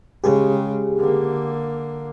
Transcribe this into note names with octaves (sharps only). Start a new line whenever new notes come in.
C#3 G#3 G4 G#4
D3 A#3